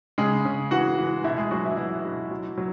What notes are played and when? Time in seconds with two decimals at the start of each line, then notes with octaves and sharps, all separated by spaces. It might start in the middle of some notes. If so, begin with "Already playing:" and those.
0.18 C#3 G#3 G#4
0.45 C#3
0.71 E3 F#4 F#5
0.98 E3
1.24 B2 E4 E5
1.38 G#3 G#4
1.51 F#3 F#4
1.65 E3 E4
1.77 E3 F#3 E4
2.05 B2
2.31 F#3
2.58 F#3